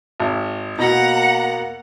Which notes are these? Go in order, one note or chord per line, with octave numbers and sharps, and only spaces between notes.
G#1
B2 A#3 F#5 A#5